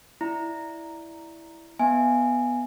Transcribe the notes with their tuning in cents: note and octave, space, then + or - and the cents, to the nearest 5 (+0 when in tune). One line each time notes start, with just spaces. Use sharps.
E4 +0 D5 +0 A#5 +0
B3 +0 E5 -30 G#5 +0